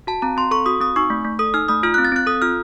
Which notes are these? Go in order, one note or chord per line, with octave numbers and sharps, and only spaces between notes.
F#4 A5
C4 A#5
C4 C6
A4 C#6
F#4 D#6
C4 D#6
D#4 C#6
A3
A3
A4 D#6
D#4 F6
A3 D#6
F4 F6
F#6
C4
A6
C4 F#6
A4 D#6
F4 F6